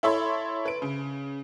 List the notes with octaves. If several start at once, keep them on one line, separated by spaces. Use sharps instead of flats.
E4 A4 C#5 E5 B5 C6
B4 D7
C#3